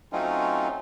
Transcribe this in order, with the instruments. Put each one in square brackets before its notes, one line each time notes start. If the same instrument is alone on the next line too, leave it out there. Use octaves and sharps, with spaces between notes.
[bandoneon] F#3 A3 C4 C#4 D#4 F4